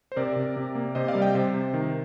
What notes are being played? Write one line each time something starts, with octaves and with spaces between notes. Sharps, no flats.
C5
C3 A#4 D5
C3
C3
A#3
C3 C5 D#5
D5 F5
G3
D#5 G5
C3 C5
C3
D#3